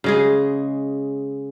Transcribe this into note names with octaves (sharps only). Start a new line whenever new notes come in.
C#3 G#3 G#4